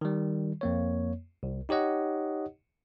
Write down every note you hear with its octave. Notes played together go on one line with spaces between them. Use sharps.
D#3 G3
F2 A#3 C#5
C2
D#4 G4 C#5 D#5 F#5